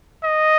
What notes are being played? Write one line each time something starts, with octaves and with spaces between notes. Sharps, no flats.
D#5